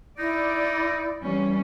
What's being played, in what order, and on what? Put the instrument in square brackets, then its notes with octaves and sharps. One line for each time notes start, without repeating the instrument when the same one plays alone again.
[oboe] D#4 [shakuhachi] E4 [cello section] D5
[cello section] E3 G3 C#4